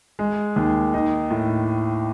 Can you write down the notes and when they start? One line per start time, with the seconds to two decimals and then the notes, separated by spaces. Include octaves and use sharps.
0.19 G#3
0.56 D#2
0.94 D#4
1.31 A2